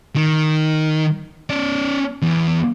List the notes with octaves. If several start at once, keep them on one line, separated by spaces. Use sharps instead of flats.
D#3
C#4 D5
E2